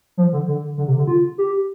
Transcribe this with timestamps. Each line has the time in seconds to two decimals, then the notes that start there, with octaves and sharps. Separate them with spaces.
0.17 F3
0.33 D3
0.48 D3
0.78 D3
0.87 C3
0.98 D3
1.07 F4
1.38 G4